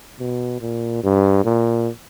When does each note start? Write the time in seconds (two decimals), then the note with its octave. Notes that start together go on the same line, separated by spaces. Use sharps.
0.20 B2
0.61 A#2
1.03 G2
1.45 A#2